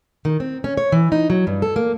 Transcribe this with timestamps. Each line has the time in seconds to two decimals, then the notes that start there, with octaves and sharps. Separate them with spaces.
0.25 D#3
0.40 C4
0.64 C#4
0.77 C#5
0.92 E3
1.12 D#4
1.30 F#3
1.47 G2
1.62 A4
1.76 A#3